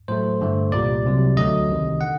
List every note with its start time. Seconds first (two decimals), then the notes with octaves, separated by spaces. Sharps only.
0.08 A2 F#3 A3 C5
0.41 G2 D3 A3
0.72 C2 A#2 G3 D5
1.04 C2 C3 F#3
1.37 D2 D3 F#3 A3 D#5
1.69 C2 C3 D#3
2.01 D3 F#5